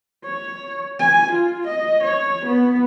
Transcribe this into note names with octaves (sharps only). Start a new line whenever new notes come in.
C#5
G#5
F4
D#5
C#5
B3